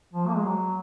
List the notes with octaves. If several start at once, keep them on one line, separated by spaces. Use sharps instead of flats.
F3
A#3
G#3
F#3